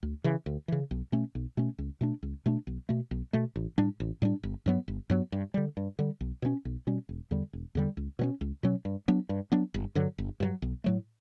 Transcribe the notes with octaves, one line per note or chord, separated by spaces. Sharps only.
D2
C#3 E3
D2
C#3 E3
B1
B2 A3 C#4
B1
B2 A3 C#4
C#2
B2 A3 D4
C#2
B2 A3 D4
B1
B2 A3
B1
B2 A3
A1
A2 G3 D4
A1
A2 G3 D4
G1
G2 F#3 B3
G1
G2 F#3 B3
G2
D3 G3
G2
D3 G3
B1
B2 G3 C#4
B1
B2 G3 C#4
E1
E2 D3 G3
E1
E2 D3 G3
C#2
B2 F#3 C#4
C#2
B2 F#3 C#4
G2
F#3 B3 D4
G2
F#3 B3 D4
G1
G2 D3 F#3
G1
G2 D3 F#3
B1
A2 F#3 A3